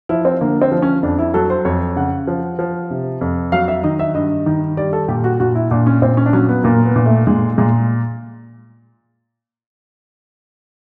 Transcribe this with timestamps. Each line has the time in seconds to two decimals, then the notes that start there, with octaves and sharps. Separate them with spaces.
0.09 F3 E4
0.25 C4
0.41 D3 A#3
0.62 C4
0.72 F3
0.82 C#4
1.03 F2 D4
1.19 E4
1.34 F#3 A4
1.50 C5
1.65 F2 C#5
1.96 C#3 F#5
2.27 F3
2.59 F3
2.91 C3
3.21 F2
3.52 F#3 F5
3.68 E5
3.84 D#3 D#5
3.99 E5
4.14 G2 D#5
4.46 D#3
4.77 G3 D5
4.93 A4
5.08 A#2 G4
5.24 F#4
5.40 A#2 F#4
5.55 E4
5.71 A#2 D4
5.86 C#4
6.02 A#2 C4
6.17 C#4
6.26 D4
6.33 F#3 C#4
6.49 B3
6.64 A#2 A#3
6.85 B3
6.96 A#2
7.06 A3
7.27 A#2 G#3
7.58 A#2 G#3